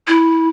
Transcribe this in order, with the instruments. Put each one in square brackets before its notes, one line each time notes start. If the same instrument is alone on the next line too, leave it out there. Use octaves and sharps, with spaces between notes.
[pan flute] E4